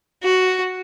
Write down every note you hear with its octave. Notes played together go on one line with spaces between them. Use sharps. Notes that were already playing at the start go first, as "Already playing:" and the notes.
F#4